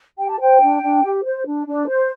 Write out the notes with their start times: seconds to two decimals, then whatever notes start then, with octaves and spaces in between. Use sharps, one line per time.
0.18 G4 G5
0.29 A5
0.40 C5 G5
0.61 D4
0.82 D4
1.04 G4
1.24 C5
1.46 D4
1.67 D4
1.89 C5